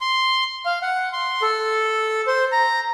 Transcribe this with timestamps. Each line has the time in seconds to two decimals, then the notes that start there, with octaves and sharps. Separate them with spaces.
0.01 C6
0.66 F5
0.82 F#5
1.13 C6
1.42 A4
2.27 C5
2.52 A#5